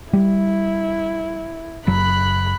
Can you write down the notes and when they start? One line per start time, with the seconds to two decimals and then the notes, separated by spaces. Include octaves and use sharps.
0.13 G3 E4
1.87 F#1 F#3 B5 F#6